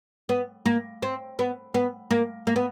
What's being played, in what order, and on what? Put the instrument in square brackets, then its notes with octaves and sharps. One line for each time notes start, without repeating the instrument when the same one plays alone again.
[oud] B3
A#3
C4
B3
B3
A#3
A#3
B3